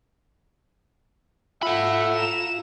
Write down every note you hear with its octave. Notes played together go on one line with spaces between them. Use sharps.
F4 A4 E5 F#5 B5
A#5 E7